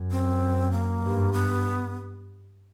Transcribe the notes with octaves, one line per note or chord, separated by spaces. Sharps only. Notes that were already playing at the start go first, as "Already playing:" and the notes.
Already playing: F#2
C4
A#3
G2
B3